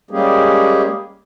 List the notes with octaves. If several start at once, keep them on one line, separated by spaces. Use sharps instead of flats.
G3 G#3 A#3 C#4 G4 G#4